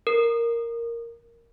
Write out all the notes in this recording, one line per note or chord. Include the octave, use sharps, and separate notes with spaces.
A#4